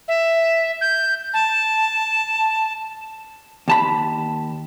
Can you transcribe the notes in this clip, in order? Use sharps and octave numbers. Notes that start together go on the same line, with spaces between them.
E5
G6
A5
D#2 A5 B5